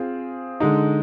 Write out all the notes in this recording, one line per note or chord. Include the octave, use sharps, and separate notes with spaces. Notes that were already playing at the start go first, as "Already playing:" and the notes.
Already playing: C4 F4 G#4
D3 G#3 D#4